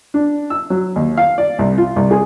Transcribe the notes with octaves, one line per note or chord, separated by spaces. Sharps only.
D4
E6
F#3
D#2
F5
D5
C2
F4
C2
G#4